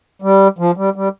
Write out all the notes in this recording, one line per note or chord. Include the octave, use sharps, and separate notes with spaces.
G3
F3
G3
G3